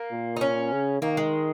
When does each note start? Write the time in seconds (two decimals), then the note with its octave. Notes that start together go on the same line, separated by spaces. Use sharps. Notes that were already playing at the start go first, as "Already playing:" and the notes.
Already playing: A#3
0.11 A#2
0.36 D#4
0.41 C#4
0.72 C#3
1.02 D#3 A#3
1.17 G#3